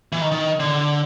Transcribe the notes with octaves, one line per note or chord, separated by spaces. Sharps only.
E3
D#3
D#3
D3